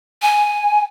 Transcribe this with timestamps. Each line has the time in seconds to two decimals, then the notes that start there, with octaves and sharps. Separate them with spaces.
0.22 G#5